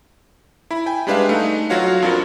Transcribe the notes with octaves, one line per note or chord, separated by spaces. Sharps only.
E4 B5
G5 G#5
G3 G#3 D4 B4 E5 F5
A3 D#4
F#3 F4 F#4 C#5 F5 F#5
F2 D4 F4 F#4 A#4